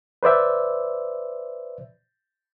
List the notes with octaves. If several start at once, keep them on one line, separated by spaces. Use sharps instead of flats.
B4 C5 D5 E5